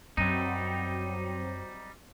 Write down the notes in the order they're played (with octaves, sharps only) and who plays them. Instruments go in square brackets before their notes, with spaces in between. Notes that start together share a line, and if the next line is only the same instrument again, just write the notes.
[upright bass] F#2 [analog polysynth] F#3 C4 [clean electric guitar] G3 D#4